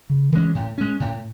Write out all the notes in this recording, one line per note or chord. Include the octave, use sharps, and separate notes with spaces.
C#3
E3 G#3 C#4
A2
G#3 C#4
A2